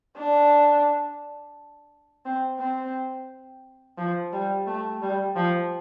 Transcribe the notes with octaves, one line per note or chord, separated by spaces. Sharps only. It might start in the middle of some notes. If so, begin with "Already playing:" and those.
D4
C4
C4
F3
G3
A3
G3
F3